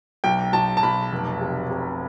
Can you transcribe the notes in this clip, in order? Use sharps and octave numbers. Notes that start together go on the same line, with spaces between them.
B1 G5
B1 A5
A5
B1 B5
F1
C3
C3